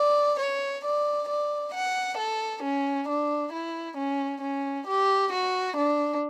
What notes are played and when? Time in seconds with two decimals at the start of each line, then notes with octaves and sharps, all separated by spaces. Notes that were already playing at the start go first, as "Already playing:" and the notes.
Already playing: D5
0.39 C#5
0.84 D5
1.29 D5
1.73 F#5
2.17 A4
2.62 C#4
3.08 D4
3.52 E4
3.97 C#4
4.42 C#4
4.87 G4
5.32 F#4
5.76 D4